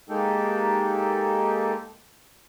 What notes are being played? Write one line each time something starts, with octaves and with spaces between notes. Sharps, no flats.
G#3 A#3 D#4 G4 A4